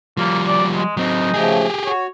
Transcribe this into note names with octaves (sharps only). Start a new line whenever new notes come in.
F3 G3 A#3
D5
G#3
F#3 C4 D#4
C#3 F3 A3 G4 G#4
F#4 C#5